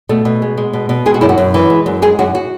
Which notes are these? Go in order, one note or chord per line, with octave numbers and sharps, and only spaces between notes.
B2 A3
B2
G#3
G#3
B2
B2
G#3 G#4
F#4
F#2 E4
F#4
F#2
E3
G#3
F#2
G#3 G#4
F#2 F#4
F#4